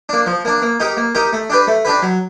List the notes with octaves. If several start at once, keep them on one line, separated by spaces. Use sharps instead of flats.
A#3 D4
F3
A#3 D4
A#3
D#4 G4 A#4
A#3
D#4 G4 A#4
A3
D4 G4 B4
A3
D4 G4 B4
F#3